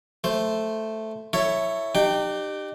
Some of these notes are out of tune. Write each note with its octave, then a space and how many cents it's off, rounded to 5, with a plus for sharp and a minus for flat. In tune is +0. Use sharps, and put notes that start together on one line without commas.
A3 +0 C5 +0
E4 +0 A4 +25 C#5 +0
D#4 -40 G4 +0 G5 +0